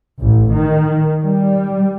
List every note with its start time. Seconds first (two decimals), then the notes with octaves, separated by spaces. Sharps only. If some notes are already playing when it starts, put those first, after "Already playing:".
0.21 A1
0.53 D#3
1.23 G3